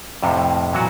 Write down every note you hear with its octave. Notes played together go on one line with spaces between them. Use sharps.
F2 A2 C3 F3
A#2 E3 F#3 F#4